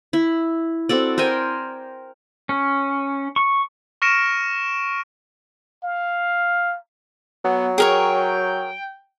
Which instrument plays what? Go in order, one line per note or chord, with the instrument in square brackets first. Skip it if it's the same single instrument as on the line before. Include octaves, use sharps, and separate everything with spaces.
[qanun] E4
C4 F#4 A4 D5
A#4 C5 G5 G#5
[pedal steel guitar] C#4
C#6
[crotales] C#6 F6 A#6 C#7 D7 E7
[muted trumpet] F5
[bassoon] F#3 [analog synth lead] B3
[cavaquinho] G#4 A#4 C#5 [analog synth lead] G5